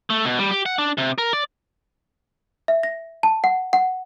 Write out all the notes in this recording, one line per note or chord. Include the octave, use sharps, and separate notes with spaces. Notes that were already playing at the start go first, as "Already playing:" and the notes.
A3
B2
G3
G4
F#5
D4
C3
A#4
D5
E5
A#6
A5
F#5
F#5